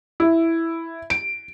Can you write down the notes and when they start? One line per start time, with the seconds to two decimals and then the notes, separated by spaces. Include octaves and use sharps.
0.20 E4
1.10 D7